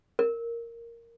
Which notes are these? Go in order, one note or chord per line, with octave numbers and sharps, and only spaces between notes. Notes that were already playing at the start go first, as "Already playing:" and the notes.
A#4